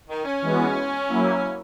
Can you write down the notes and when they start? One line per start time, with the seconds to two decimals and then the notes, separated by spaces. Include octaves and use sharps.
0.10 D#3
0.25 C#4
0.42 E3 G#3 B3 F#4
1.08 F#3 A#3 E4